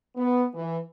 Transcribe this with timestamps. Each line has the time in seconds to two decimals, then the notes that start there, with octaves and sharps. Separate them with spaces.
0.15 B3
0.54 E3